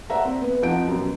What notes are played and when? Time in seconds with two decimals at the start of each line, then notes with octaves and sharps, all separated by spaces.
0.10 C5 D5 E5 F#5 A#5
0.25 C4
0.41 B3
0.62 F2 F3 D#4 F#5 G6 D7
0.88 F#2 B2